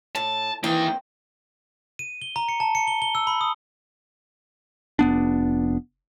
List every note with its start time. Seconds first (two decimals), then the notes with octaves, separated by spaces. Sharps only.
0.15 A2 A5
0.64 E3 A#3 C4 D#4 G5
1.99 D#7
2.22 G7
2.36 A#5
2.49 C#7
2.60 A5
2.75 C#7
2.87 G7
3.02 G7
3.15 E6
3.27 B5
3.41 D#6
4.99 F1 B3 D4